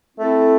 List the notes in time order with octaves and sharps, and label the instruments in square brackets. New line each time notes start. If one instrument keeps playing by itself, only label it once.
[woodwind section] A3 C4 E4 A4